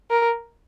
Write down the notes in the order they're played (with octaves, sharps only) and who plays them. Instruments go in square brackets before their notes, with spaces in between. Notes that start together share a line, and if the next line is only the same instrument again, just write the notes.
[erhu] A#4